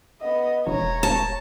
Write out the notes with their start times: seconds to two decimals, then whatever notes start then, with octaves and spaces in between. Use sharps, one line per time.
0.21 B3 D#5
0.67 E1 C#5 A#5
1.03 A5